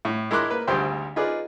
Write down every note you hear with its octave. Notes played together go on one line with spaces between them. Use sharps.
A2
G#3 E4 A#4 C6 D6 F#6
A#3 B4
G#1 D2 G3 C5 G5 C6
D#4 F4 G#4 B4 D5